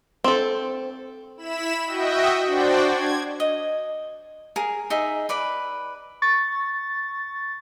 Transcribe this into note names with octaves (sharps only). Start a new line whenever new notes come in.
C4 A4
E4 B5 E7
F#4 D#5 E5 G5
D4 F#4 C5 D5 G5
G#6
D#5
G#4 A#4
D#4 G#4 E5
B4 D5 B5
C#6 A6